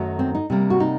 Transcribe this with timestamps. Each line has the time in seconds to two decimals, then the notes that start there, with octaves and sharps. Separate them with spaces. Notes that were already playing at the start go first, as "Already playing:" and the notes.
Already playing: F#2 D#3 F#3 A3
0.19 C4
0.35 D#4
0.50 C3 G3 A#3
0.70 F#4
0.80 D#4